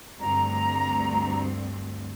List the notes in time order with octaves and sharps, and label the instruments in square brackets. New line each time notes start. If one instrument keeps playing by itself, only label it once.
[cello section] D2 G2 C4 [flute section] A#5